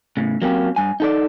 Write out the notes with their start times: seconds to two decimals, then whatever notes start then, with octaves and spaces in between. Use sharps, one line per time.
0.17 A2 C#3
0.42 F#3 A#3 C4 C#4 G4
0.76 G2 G#5
1.00 D#4 A4 D5